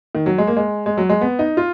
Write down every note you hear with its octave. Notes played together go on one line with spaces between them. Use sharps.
D#3
F#3
G#3
A#3
G#3
G#3
F#3
G#3
B3
D#4
F4